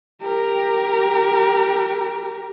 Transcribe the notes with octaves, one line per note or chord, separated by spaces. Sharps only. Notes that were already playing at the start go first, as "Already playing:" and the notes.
G4 A#4